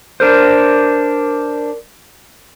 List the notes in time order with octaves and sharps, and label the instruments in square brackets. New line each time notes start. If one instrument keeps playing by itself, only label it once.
[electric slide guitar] D4 A#4 C5